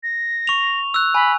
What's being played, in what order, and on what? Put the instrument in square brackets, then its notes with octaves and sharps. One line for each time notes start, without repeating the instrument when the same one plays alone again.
[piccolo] A#6
[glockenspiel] C#6 F7
E6 F#6
[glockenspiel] G#5 [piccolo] B5